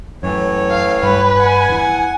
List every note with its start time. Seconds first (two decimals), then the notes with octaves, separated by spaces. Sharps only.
0.23 F#2 A2 E3 C#5
0.70 F5
1.03 G2 G3 B4
1.40 F#5 G#5
1.70 E2 E3